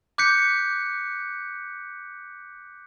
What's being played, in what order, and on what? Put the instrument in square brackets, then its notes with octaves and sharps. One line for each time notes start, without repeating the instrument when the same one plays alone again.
[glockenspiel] D6 F#6 G6 B6 C#7